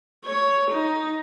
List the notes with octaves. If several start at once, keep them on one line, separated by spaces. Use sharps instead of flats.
C#5
D#4